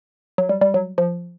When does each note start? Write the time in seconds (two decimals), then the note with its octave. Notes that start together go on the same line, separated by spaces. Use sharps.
0.38 F#3
0.49 G3
0.61 G3
0.74 F#3
0.98 F3